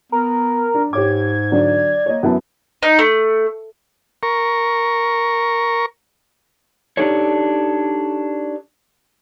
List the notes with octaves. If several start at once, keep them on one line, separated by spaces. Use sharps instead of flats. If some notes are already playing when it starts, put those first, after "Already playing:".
B3 A#4
D4
G#2 G4 C#5 D6 G#6
D3 F#3 D5
A#3 C#5 D#5
F#2 B3 E4 A5
D#4
A3
A#4 C#6
D4 D#4 G4 A4 C#5